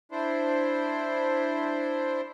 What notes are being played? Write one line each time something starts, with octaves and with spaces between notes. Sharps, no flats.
D4 E4 C5